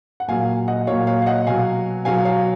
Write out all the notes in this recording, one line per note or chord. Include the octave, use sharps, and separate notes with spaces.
F#5
A#2 F#3 F5 G#5
D#5 F#5
A#2 F#3 C#5 F5
C#5 F5
F5
D#5 F#5
B2 F#3 F5 G#5
B2 F#3 F5 G#5
C#5 F5